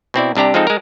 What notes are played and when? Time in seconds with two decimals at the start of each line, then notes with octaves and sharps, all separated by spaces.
0.14 B2 C4 E4 D5
0.35 C2 C3 D4 G4 A#5
0.54 F3 G#3 C4 D#4 A4
0.67 G#3 A#4